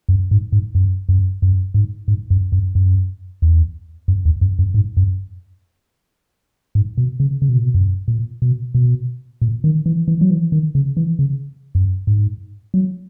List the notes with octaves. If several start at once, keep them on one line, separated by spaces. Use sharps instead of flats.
F#2
G#2
G#2
F#2
F#2
F#2
G#2
G#2
F#2
F#2
F#2
E2
F#2
E2
F#2
F#2
G#2
F#2
G#2
B2
C#3
C#3
B2
A#2
B2
F#2
A#2
B2
B2
A#2
D#3
E3
E3
F#3
E3
D#3
C#3
E3
C#3
F#2
G#2
F#3